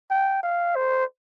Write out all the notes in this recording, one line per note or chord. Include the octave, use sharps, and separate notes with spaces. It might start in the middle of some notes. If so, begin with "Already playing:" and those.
G5
F5
C5